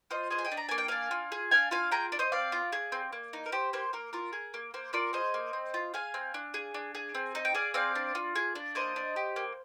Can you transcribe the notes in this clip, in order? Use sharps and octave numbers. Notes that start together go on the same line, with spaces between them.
F4 C5 D#5
G#4 C5 D#5
G#5
D#5 G5
D4
A#5
A#3 G#5
G5
D4 F5 G#5
F4
G#4
D4 F5 G#5
F4 F5 G#5
G#4 G5 A#5
D4
C5 D#5
C4 D5 F5
F4
G#4
C4
A#3
D#4
A#4
G4 C5
A#3 C5
A#3 A#4
F4 A#4
G#4
A#3
A#3 C5
F4 A#4 D5
G#4 C5 D#5
A#3
C4
F4
G#4 F5 G#5
C4
D4
G#4
D4
G#4
C4
D#4
G5
G#4 D5 F5
C4 D5 F5
D4
F4
G#4
D4
A#3 C5 D#5
D4
G4
A#3